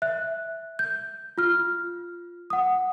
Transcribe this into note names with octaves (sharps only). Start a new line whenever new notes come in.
E5 F#6
G6
F4 F6
F#5 D#6